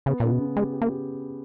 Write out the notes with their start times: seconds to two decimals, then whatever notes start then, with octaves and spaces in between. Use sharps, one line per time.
0.06 C#3 B3
0.20 A#2 C#3
0.31 B2
0.40 C#3
0.56 G#3 G4
0.73 G4
0.81 A#3
0.89 G4